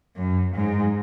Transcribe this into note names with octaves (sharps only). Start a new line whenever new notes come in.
F#2
G#2